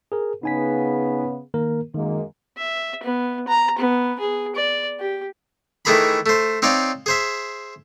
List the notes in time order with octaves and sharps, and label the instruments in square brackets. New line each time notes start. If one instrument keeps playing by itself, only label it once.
[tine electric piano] G#4 A#4
[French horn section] C#3 B3 [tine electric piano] D#4 G#5 B6
[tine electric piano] D#3 A#3 A#4
[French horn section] F#2 G#3 A#3 [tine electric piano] D#3
[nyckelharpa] E5
B3
A#5
B3
G#4
D5
G4
[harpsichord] D#3 E3 A3 G#4 A#5 B5
A3 C5
C4 D#4 C#5 D5 F5
G#4 C5 E5